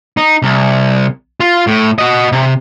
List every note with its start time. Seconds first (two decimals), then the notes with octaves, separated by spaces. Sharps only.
0.17 D#4
0.42 C2
1.40 F4
1.67 A2
1.98 F#4 D#5
2.32 C3